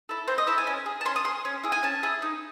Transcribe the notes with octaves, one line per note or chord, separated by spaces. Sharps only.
E4 A4
C4 C5
D#5
E4 A4 E5
G#5
C#4
G#4
A5
C#4 C6
D#6
G#4 C6
C#4
E4 G#4
G#5
C#4 A5
E4 G#4
D#4